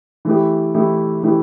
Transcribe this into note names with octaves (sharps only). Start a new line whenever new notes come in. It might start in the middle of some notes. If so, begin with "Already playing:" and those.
E3 A3 E4 G4
E3 A3 E4 G4
E3 A3 E4 G4